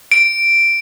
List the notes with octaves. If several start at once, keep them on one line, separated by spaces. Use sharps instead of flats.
D7